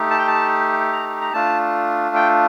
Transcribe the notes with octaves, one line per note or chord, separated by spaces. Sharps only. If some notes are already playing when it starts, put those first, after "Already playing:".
Already playing: A3 D#4 G4
A5
G5
A5
A#5
A#5
A3 D4 F4 A5
G5